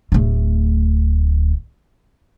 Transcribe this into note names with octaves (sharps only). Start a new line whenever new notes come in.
D1 A3